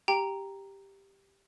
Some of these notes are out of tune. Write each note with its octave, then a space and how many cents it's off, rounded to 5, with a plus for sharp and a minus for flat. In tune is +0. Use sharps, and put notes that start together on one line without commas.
G4 +0 G5 +0 A#5 +0